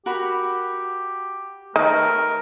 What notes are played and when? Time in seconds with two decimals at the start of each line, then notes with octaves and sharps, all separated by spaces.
0.06 F#4 G4 A#4 B5
1.76 D#3 A3 D#4 A#4 B4 C#5